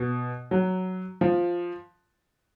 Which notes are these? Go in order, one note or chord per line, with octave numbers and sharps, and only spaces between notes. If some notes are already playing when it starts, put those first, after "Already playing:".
Already playing: B2
F#3
F3